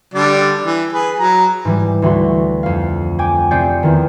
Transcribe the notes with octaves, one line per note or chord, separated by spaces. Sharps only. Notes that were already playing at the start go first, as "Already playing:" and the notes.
D3 G3 D5
E3
G#4 B4
F#3 A#5
G#2 E3 G3
D2 E3 A3 F#4 C6
F2 F5
G5 G#5 D6
C3 C4 G#4 D5 G6 C#7
E2 D#3